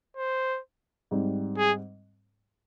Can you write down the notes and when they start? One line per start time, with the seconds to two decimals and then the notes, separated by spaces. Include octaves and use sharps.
0.17 C5
1.11 G#2 G3 C4
1.58 G#4